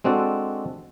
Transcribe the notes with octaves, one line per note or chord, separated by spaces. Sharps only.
G#3 C4 D4 F#4 A4